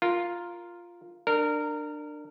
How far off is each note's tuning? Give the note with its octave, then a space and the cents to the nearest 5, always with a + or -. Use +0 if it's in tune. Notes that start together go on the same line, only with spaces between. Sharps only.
F4 +0 A#4 +0
D4 +20 A#4 -20